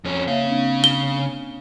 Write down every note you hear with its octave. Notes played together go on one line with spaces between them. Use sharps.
F2 C#4
C#3 A#3 C#5 E5 F5
C4 D4
G7